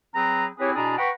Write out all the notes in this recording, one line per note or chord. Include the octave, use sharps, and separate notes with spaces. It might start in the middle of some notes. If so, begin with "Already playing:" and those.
F#3 C4 G#4 B4 A#5
C4 E4 G4 G#4 B4 C#5
B2 D4 E4 G#4 D5 A#5
B4 F#5 G5 A#5 B5 C#6